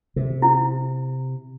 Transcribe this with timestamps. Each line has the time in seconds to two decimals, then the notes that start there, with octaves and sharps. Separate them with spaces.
0.16 C3
0.42 E4